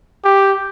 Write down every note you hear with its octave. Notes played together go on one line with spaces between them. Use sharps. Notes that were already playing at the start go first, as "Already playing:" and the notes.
G4